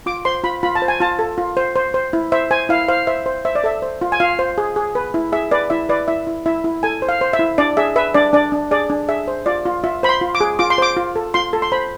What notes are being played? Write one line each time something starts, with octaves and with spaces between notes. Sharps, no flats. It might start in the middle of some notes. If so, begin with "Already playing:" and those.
F4 D6
C5 C6
F4 B5
F4 B5
A5
C5
G#5
F4 A5
A4
F4
C5
C5
C5
E4
C5 E5
C5 G#5
E4 F5
C5 F5
C5 E5
C5
C5 E5
D5
A4 E5
C5
F4
G#5
F4 F5
C5
G#4
G#4
B4
E4
G#4 E5
B4 D5
E4 E5
B4 D5
E4 E5
E4
E4 E5
E4
A4 G#5
C5
F5
C5
E5
E4
D4 D5
G#4 E5
B4 E5
D4 D5
D4 D5
D4
G#4 D5
D4
G#4 E5
C5
F4 D5
F4
F4 E5
C5 B5
C6
F4
D6
G#4
F4 D6
C6
C5 D6
F4
A4
F4 C6
A4
C6
C5 B5